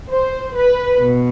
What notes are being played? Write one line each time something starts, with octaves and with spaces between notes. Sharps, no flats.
C5
B4
B2